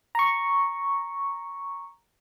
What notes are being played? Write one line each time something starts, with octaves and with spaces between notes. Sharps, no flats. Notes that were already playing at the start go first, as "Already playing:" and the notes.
A#5 C#6